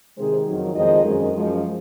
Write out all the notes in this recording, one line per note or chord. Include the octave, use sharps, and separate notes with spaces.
C3 D#3 G#3 G#4 C5
F2 D#3 F#3
F2 D#3 G#3 C5 D#5
F#2 D#3 G#3
F#2 F3 G#3